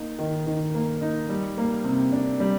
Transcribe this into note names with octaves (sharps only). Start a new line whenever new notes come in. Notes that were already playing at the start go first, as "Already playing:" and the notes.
Already playing: A#3 D#4
D#3
D#3
A#3
D#4
G3
A#3
C3
D4
G3